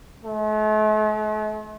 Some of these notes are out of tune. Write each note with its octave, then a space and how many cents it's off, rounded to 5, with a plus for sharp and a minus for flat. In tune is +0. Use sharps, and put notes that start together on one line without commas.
A3 -45